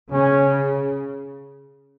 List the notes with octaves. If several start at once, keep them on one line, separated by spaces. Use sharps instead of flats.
C#3 C#4